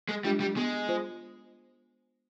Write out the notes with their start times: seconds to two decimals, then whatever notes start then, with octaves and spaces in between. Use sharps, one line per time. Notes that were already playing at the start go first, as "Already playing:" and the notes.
0.09 G#3
0.24 G3 G#3 D4 F4
0.40 G3
0.56 G#3 B3
0.88 F4 C5